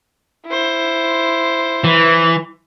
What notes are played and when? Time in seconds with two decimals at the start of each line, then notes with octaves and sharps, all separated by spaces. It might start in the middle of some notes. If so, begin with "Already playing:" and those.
0.47 E4 C5
1.84 E3